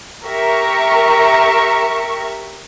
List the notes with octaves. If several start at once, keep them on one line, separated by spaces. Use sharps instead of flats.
G4 A#4 E5 A#5 C#6